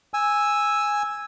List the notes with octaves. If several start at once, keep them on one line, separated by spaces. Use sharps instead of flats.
G#5 E6